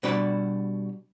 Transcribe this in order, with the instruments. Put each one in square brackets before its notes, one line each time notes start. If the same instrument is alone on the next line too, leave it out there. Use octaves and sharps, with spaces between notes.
[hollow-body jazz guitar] B2 G3 D4 F#4 D5 B5